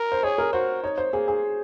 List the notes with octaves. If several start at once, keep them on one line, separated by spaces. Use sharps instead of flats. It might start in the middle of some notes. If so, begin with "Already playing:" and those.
Already playing: A#4
C5
G#4 C#5
A#4
F#4 C5
D#4 C#5
C5
A#3 G#4
G#4